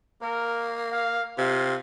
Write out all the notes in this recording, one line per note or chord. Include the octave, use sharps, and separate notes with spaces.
A#3 A#4
F5
C3 F4